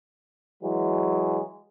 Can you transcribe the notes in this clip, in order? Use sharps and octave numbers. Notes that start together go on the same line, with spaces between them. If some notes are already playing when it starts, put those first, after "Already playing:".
E3 F#3 G#3